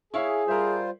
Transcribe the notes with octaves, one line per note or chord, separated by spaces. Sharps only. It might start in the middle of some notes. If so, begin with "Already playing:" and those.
E4 G#4 C#5 F5
G3 F4 A#4 C5 E5